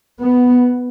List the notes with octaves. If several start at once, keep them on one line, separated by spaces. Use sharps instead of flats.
B3